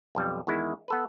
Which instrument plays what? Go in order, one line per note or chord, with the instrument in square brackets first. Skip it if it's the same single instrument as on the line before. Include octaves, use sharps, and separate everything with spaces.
[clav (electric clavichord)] B1 F2 G3
E2 D#3 G#3 E4
B3 A4 B4